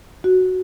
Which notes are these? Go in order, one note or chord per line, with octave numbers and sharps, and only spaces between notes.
F#4